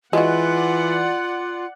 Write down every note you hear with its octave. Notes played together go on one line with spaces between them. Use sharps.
E3 G#3 F4 F#4 D5 F#5